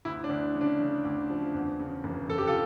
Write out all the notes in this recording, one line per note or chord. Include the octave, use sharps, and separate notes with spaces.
D2 E4
D4
D2
C#3
D4
C#3
D2
F3
E2
C#3
F1
F1 A4
G4
F4 A4